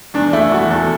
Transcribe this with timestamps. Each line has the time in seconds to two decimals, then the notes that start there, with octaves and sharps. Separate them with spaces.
0.14 E2 D4
0.33 A3 E4
0.52 E2 F#4
0.70 E2 A4